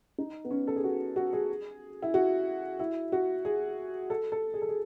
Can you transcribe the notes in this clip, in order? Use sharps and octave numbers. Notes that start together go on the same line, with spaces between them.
D#4
B3
C#4
A4
G#4
F#4
F#4
G#4
E4
F#4
E4
F#4
G#4
A4
A4
G#4
A4
G#4